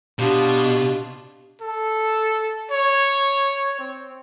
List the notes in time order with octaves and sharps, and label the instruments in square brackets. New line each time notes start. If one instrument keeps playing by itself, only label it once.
[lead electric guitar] B2 [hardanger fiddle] D4 F4 [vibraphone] G4
[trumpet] A4
C#5
C4